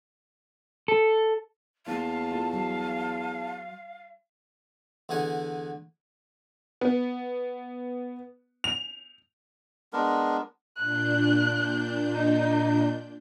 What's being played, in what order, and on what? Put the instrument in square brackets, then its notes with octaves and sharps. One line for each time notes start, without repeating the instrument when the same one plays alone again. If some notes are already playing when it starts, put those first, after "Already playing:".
[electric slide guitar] A4
[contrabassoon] E2 [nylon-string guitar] A#3 [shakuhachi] F5 [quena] A5
[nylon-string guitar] F4 A4
F#3
[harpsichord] E2 D3 F#5 G#5
[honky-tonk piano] B3
F7
[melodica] G#3 B3 D4 A#4
[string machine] A#2 D4 G6 [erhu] F#6
[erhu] D#4